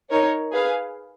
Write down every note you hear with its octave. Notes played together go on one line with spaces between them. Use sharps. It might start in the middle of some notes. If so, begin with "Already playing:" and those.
D#4 A#4 C#5
G#4 B4 F5